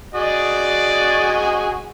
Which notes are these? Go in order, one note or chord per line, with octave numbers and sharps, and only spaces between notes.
F#4 G#4 D5 D#5